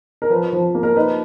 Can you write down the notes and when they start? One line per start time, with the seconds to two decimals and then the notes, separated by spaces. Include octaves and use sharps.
0.22 A#4
0.30 F3 B4
0.53 F3
0.75 A#3
0.83 A#4
0.96 D#4 B4